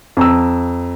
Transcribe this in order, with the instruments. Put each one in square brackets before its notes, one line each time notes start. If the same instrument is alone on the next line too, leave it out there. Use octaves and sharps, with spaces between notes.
[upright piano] F2 A#5 E6